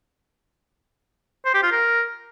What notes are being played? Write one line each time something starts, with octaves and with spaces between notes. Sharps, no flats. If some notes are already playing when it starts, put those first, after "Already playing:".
C5
G4
F4
A#4